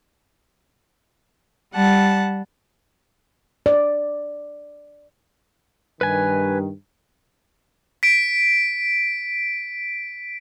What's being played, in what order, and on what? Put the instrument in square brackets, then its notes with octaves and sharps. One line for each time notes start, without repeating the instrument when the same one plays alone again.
[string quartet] G3 F#5 A5
[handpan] D5
[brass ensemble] G2 D#3 [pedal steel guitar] B4 G#5
[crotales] B6 D7